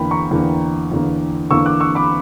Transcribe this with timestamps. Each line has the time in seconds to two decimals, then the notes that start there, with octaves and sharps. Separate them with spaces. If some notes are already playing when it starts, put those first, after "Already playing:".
Already playing: E2 D3 A#3 G5 B5
0.11 A#5 C#6
0.31 E2 D3 A#3
0.92 E2 D3 A#3
1.51 E2 D3 A#3 C#6 E6
1.66 D6 F#6
1.80 C#6 E6
1.95 B5 D6